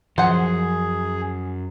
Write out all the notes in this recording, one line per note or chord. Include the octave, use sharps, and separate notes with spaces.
F#2 F3 G#4 C5 F#5